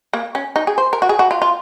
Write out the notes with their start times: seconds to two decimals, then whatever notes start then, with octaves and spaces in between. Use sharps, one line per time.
0.13 A#3
0.35 C#4
0.56 D#4
0.67 G#4
0.78 C5
0.93 A#4
1.02 F#4
1.09 G#4
1.19 F#4
1.31 F4
1.42 F4